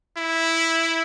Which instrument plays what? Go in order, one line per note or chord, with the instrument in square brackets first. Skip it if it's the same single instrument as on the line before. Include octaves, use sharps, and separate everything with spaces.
[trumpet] E4